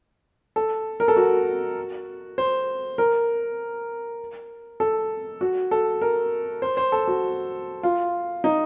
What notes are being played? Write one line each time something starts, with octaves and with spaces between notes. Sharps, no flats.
A4
A#4
A4
F#4
C5
A#4
A4
F#4
A4
A#4
C5
C5
A4
F#4
F4
D#4